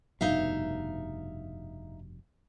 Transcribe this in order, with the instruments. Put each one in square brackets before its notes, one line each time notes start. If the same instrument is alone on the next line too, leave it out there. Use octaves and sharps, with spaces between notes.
[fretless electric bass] F1 G2 B2 [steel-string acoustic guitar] D#4 E5 F5